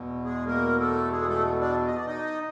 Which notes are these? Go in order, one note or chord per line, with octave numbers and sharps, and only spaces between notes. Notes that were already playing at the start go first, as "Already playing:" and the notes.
Already playing: E2 B2
G#3 G#4
A#3 A#4
A3 A4
G#3 G#4
A3 A4
D4 D5
D#5
D5
D#4 D#5